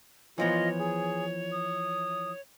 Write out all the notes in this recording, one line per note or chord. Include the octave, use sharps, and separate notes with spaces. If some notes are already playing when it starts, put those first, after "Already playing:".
E3 F3 B3 F4 C#5 D#5
G#4
D#6